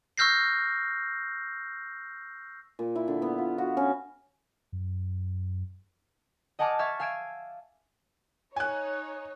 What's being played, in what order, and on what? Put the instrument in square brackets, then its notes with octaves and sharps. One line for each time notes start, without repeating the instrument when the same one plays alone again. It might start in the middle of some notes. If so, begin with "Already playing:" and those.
[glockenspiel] C#6 E6 F6 G6 A#6 C7
[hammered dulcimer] A#2
E4
D3
B3
F4
F#4
C#4
[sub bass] F#2
[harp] D#5 F#5 G#5 A5 D6 F6
E5 C#6 E6 F6 G#6 A6
F5 G#5 E6 G#6 D7 E7
[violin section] D#4 C#5 [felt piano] G#5 F#6